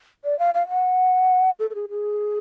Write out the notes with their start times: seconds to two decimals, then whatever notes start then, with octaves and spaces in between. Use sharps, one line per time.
0.24 D5
0.39 F5
0.54 F5
0.69 F#5
1.59 A4
1.70 A4
1.75 G#4
1.90 G#4